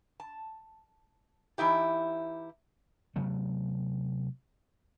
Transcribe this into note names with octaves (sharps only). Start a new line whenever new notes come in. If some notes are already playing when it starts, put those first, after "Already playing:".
A5
E3 D#4 E4 G4
C3 F#3 A3 B3